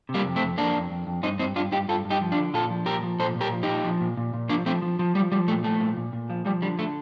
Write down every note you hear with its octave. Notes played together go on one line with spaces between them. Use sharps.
C3
G3 A#3
F2
A3 C4
F2
F2 A#3 D4
F2
F2
F2
G2 C4 D#4
G2 C4 D#4
G2 D4 F4
G2 D#4 G4
G2 F4 A4
G2
D#4 G4
F3
D4 F4
D3
A#2 F4 A4
F3
A#2 G4 A#4
F3
A#2 A4 C5
A#2
G4 A#4
F3
D#4 G4
A#2
F3
A#2
A#2
A#2
F3 A#3 D4
F3 A3 C4
F3
F3
F3 G3
F3 G3
A#2 A3
F3 A3
A#2
A#2
A#2
F3
F3 G3
D3 G3
D3 A3